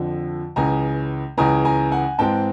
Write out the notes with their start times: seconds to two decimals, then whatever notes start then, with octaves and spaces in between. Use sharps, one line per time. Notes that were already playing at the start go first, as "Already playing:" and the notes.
Already playing: F2 D3 F3
0.56 C#2 C#3 E3 G#5 A#5
1.37 C#2 C#3 E3 G#5 A#5
1.65 G#5 A#5
1.92 F#5 G#5
2.19 G#2 E3 G#3 C4 G5 A5